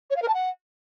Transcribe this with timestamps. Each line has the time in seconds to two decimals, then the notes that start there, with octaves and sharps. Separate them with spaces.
0.10 C#5
0.16 F5
0.22 A#4
0.28 A5
0.34 F#5